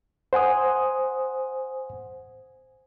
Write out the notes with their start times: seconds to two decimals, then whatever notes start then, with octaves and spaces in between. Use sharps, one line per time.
0.33 C5 F#5 G#5 D#6